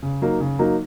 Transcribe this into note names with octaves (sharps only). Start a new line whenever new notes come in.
C#3
F#3 A#3 D#4
C#3
F#3 A#3 D#4